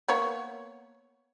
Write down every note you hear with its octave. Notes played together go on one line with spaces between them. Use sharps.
A#3 B3 C#5